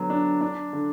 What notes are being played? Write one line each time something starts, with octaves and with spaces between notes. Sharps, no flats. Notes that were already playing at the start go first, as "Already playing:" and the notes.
Already playing: D3 F#3 B3
D4
D4
D3